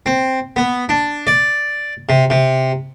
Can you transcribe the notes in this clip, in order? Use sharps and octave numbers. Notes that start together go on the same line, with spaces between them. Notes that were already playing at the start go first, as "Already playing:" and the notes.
C4
B3
D4
D5
C3
C3